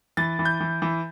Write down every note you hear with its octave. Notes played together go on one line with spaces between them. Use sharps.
E3 A6
E3
G6
E3
E3